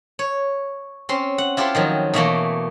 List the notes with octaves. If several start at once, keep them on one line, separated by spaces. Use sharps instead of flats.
C#5
C4 C#4 C6
F#5
E4 F4 G4 A4 C5
D#3 F3 F#3
B2 E3 A3 A#3